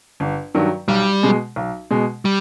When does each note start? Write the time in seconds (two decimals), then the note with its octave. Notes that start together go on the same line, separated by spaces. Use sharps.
0.20 G1
0.54 G2 D#3 F#3
0.88 B1 G3
1.23 B2 G#3
1.56 B1
1.91 B2 G#3
2.25 G3